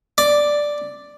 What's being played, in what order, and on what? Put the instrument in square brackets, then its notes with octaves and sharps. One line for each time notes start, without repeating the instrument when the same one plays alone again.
[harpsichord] D5